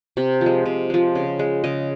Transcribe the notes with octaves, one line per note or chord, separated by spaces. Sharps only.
C3
F3
G#3
C3
F3 G#3
C#3
G#3
C#3 D#5